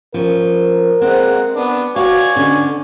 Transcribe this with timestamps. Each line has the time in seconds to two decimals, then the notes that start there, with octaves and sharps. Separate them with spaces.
0.14 F3 C#4 A#4
1.02 G#3 A#3 C4 F#5
1.55 B3 D4
1.96 F#4 D5 F5 G#5 C#6
2.36 D3 C#4 D4